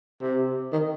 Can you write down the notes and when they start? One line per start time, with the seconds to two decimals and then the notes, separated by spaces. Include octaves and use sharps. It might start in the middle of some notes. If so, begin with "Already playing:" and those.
0.22 C3
0.73 D#3